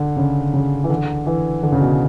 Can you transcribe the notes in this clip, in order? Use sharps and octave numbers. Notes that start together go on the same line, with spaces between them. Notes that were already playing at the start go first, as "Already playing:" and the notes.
Already playing: D3
C#3
C#3
E3
D3
E3
D3
C#3
B2